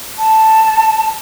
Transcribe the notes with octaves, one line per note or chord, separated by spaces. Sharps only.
A5